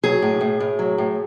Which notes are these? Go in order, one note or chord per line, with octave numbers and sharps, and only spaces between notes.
F#3 G#4
A2
A2
A2
F#3
A2